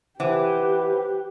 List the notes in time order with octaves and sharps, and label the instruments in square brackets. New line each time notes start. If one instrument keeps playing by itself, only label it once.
[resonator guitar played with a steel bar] E3 [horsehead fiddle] G4 [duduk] B4 [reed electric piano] C5 F#5 D6